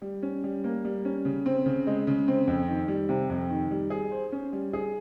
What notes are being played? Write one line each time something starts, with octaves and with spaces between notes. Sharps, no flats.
G3
C#4
G3
A#3
G3
C#4
C#3
C4
C#3
G#3
C#3
C4
F2
D#3
G3
C3
F2
D#3
G3
G#4
C5
C#4
G3
G#4